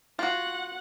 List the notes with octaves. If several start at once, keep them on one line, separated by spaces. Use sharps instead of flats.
F4 F#4 F#5